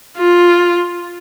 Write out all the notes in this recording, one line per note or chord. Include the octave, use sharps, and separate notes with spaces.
F4